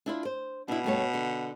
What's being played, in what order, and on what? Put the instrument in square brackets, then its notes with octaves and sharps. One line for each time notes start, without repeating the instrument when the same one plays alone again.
[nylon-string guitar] D4 E4 F4
C5
[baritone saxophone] B2 [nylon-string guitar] D4 E4
[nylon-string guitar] G2 A3 C#5
D3